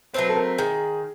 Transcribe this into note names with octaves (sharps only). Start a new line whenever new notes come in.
F#3 A3 C4 B4
A4
A#4
D#3 G#4